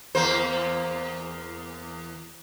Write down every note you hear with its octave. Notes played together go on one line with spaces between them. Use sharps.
E2 A#3 C5